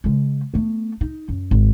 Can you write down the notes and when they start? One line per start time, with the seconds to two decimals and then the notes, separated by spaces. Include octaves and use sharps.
0.04 C#3 G#3
0.54 A3 B3
1.01 D#4
1.29 F#2
1.51 G#1